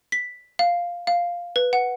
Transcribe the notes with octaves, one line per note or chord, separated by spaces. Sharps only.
B6
F5
F5
B4
F#5